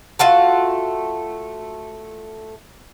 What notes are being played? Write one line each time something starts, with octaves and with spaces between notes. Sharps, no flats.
A3 F4 F#4 A5